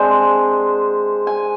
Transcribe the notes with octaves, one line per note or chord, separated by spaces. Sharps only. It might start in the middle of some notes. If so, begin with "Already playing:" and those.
Already playing: C3 G#3 D4 C5
G#5